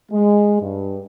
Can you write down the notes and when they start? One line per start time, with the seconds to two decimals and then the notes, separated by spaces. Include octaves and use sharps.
0.12 G#3
0.62 G2